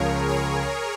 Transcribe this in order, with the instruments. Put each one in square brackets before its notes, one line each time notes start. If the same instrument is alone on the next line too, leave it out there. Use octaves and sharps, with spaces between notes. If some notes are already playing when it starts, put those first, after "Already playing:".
Already playing: [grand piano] C#2 C#3 F3 [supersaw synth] G#4 A#4 C#5
[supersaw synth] G#4 C#5